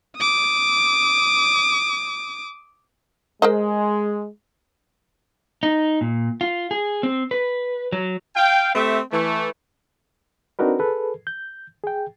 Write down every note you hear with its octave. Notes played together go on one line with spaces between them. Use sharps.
D6 D#6
G#3 A#4 C5 D#5
D#4
A#2
F4
G#4
C4
B4
F#3
F5 G5
A3 C4 G4 E5
E3 A3
C4 D4 D#4 F#4 A#4 B4
G#4 A4 B4
G6
G#4 G5